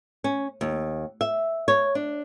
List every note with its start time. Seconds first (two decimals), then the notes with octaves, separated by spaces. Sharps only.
0.24 C#4
0.61 D#2
1.21 E5
1.68 C#5
1.95 D4